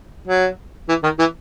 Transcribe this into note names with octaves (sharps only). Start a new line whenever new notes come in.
F#3
E3
D#3
E3